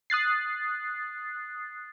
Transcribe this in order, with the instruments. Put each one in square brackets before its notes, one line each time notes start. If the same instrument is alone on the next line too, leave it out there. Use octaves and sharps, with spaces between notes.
[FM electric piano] D#6 F#6 A6 C7